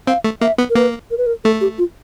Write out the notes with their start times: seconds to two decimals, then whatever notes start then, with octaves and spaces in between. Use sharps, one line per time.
0.07 C4 F5
0.24 A3
0.41 A#3 E5
0.58 B3
0.70 A#4
0.75 A#3 B4
1.11 A#4
1.18 B4
1.26 A#4
1.44 A3 A4
1.61 G4
1.78 F4